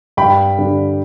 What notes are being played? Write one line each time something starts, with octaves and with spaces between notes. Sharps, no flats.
G2 G5 B5
D3 G3 D4